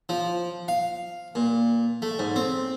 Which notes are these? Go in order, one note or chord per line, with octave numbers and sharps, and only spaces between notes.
F3
F5
A#2
A3
G#2
C4